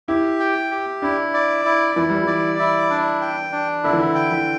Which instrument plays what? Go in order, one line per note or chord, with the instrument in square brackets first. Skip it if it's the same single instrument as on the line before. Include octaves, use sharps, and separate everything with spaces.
[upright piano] E4 [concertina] G4
[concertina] G5
G4
[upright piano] D4 [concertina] E4
[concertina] D5
E4
[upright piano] E3 [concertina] E4
[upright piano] G3
[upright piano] E3 [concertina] D5
[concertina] E4
D4
G5
D4
[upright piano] D3 [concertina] E4
[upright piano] E3
D3
[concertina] G5
[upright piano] E3